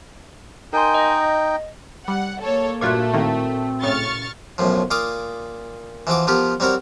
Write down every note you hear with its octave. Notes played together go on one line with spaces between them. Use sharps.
D#4 A#4 G5 G#5 C6
D#5
G3 F#5
A#3 A4 C#5
G2 A#2 A3 F4 F#4 F#6 G#6
A2 D#3 A#3 C4
A2 C#3 C#6 F6 A6
B1 F#2 A2 F3
A#2 F5 C6 D6 D#6
E3 F3 F#4 D6
F3 B3 G4 A#4
G3 C4 F#4 A#4 C#5